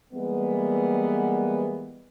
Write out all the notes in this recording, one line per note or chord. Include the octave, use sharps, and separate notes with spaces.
E3 G3 G#3 A#3 B3